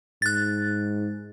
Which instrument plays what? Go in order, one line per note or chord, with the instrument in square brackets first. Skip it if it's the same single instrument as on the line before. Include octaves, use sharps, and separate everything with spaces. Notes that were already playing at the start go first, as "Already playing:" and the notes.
[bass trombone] G#2 [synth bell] F#6 A6